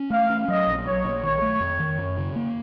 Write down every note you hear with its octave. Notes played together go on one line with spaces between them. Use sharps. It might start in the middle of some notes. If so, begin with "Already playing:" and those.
Already playing: C#4
A3 F5
C#4
F#3 D#5
A#1
F#3 C#5
A#1
D#3 C#5
A3
F2
D#3
F#2
C#3
A#3